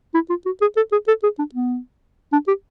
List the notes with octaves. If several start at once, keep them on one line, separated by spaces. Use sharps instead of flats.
E4
F4
F#4
G#4
A4
G#4
A4
G#4
D4
B3
D4
G4